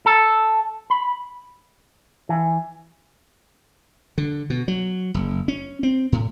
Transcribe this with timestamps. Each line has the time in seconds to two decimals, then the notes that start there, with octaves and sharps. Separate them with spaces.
0.06 A4
0.90 B5
2.29 E3
4.18 D3
4.50 B2
4.68 F#3
5.14 F#1
5.48 C#4
5.83 C4
6.12 A2